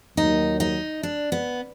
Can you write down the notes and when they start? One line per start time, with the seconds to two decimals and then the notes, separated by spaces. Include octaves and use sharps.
0.17 D#2 D#3 F#3 D#4
0.60 D#4
1.03 D4
1.32 B3